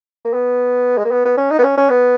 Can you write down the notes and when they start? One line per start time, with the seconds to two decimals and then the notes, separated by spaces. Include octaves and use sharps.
0.25 A#3
0.33 B3
0.98 G#3
1.05 A#3
1.11 B3
1.25 B3
1.37 C#4
1.51 D#4
1.58 B3
1.64 C#4
1.77 C#4
1.90 B3